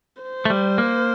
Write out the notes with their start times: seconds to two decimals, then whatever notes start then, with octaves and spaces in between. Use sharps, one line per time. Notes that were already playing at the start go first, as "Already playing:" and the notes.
0.23 C5
0.45 A3
0.50 G3
0.78 A#3